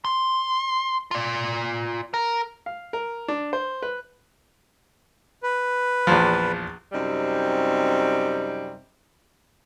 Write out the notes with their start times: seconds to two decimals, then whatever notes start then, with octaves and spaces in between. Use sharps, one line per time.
0.05 C6
1.11 F4 D5
2.14 A#4
2.66 F5
2.93 A#4
3.28 D4
3.53 C5
3.82 B4
5.43 B4
6.07 A#1 E2 F3
6.93 F#2 C3 G3 C4 D#4